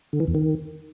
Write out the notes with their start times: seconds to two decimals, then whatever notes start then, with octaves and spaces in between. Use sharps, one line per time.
0.13 D3
0.20 E3
0.27 E2
0.35 D#3